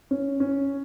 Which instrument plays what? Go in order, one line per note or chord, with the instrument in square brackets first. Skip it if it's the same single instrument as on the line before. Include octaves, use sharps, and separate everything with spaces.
[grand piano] C#4
C#4